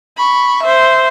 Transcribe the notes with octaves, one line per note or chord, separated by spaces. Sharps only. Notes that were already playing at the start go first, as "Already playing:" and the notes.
B5 C#6
C5 E5